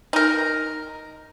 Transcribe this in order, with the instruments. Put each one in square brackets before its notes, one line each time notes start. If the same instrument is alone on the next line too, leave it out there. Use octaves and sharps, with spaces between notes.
[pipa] D#4 A#4